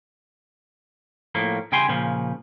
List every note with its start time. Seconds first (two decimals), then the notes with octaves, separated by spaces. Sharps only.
1.35 A2 F3 A#3
1.72 C#3 G3 G5 G#5 C6
1.89 A#2 C#3 F3